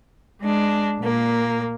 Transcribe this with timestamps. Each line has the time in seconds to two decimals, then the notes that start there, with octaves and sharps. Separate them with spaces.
0.42 G#3 D4
1.00 A#2 A#3